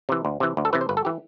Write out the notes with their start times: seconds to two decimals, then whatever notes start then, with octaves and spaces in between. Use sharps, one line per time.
0.09 C3 E3
0.25 D2
0.40 C3 E3
0.57 D2
0.65 A4
0.73 C3 E3 B4
0.81 C5
0.89 G1 B4
0.97 A4
1.05 E3 G4